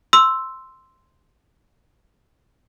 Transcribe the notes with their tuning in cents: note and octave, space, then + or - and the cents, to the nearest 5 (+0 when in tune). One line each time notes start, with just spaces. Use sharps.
C6 +0 E6 +0